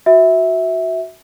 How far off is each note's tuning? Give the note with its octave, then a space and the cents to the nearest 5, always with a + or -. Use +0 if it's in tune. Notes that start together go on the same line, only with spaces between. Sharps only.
F#4 +0 E5 -15